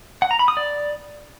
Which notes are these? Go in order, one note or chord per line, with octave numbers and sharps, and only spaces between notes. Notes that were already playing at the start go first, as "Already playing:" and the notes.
F#5
A#5
B5
D#6
D5